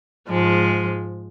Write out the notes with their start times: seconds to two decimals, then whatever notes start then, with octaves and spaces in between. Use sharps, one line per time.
0.29 G#2 F3 G#3